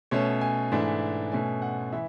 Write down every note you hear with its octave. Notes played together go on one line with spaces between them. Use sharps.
B2 A3 C#4 C#5
G#5
G#2 E3 A3 D4
B2 A3 C#4 G#5
F#5
E3 E5